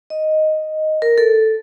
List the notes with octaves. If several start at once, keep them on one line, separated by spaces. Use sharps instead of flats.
D#5
A#4
A4